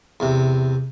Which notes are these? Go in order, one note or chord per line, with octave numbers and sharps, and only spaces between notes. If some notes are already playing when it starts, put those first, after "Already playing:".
E2 C3